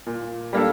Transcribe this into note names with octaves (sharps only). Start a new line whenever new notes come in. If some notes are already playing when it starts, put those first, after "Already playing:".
A#2
G3 A#3 D4 A4